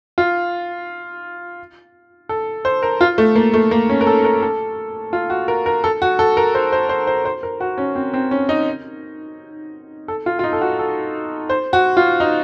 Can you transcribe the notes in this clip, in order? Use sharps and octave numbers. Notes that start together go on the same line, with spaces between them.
F4
A4
C5
A#4
F4
A3
A#3
A3
A#3
C#4
A#4
A4
A#4
A4
F4
F#4
A#4
A#4
A4
F#4
A4
A#4
C5
C5
C5
C5
C5
A#4
F#4
C#4
C4
C4
C#4
D#4
A4
F4
F4
D#4
A4
F#4
A4
C5
F#4
F4
D#4